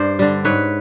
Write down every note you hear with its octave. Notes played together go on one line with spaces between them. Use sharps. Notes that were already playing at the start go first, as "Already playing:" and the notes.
Already playing: G2 C5 D5
D3 G3
G#2 B4 C#5